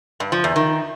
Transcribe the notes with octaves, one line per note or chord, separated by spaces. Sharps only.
G2
F3
E2
D#3